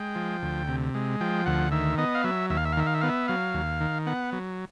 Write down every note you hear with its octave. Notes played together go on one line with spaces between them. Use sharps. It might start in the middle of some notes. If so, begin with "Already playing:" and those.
Already playing: G#3 G5
F3
D2
C3
G#3
F3 G5
D2 F#5
D#3 E5
B3 D#5
F5
F#3 E5
D#2 E5
F5
E5
F5
D#3 E5
F5
E5
B3 F5
E5
F#3 F5
D#2
D#3
B3 F#5
F#3